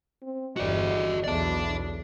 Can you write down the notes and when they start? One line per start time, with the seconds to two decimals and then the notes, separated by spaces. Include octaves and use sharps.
0.22 C4
0.57 G1 E2 F#4 D5 D#5
1.24 B1 E2 D5 A5